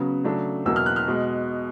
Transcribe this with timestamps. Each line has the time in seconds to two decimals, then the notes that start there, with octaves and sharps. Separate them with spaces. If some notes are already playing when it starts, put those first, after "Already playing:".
Already playing: C#3 F#3 B3
0.24 C#3 F#3 A3 D4
0.66 E2 B2 F#3 A#3 E6
0.76 F6
0.86 F#6
0.96 F6
1.08 B2 G#3